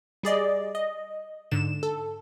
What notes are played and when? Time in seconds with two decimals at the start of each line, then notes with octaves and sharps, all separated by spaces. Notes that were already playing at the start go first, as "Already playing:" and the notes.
0.23 G3 G#4 D5 D#5
0.75 D#5
1.51 G#2 D3 E7
1.83 A4